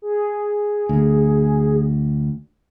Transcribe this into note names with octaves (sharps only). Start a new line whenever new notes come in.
G#4
D2